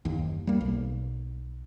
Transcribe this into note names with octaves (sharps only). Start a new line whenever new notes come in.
F#1 D#2
G3 A#3
B1